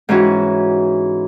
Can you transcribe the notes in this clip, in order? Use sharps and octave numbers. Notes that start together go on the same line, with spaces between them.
G#2 E3 C#4 F#4